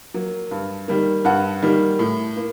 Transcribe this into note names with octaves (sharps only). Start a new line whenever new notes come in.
F#3 A#3
G2
D#3 G3 A#3
G2 F#5
D#3 G3 A#3
A2
A#3